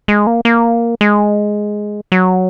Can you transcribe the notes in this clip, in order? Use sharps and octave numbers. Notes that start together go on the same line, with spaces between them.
G#3
A#3
A#3
G#3
F#3